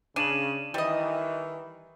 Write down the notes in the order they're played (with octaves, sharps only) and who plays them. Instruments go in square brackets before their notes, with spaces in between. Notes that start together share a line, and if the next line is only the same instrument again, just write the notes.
[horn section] C#3 [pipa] D4 [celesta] D#7 E7 F#7
[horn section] D#3 E3 [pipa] G3 D#5